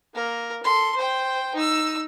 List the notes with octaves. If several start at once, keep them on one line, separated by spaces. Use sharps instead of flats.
A#3 A#4
A4 C6
C5 G5
D#4 E6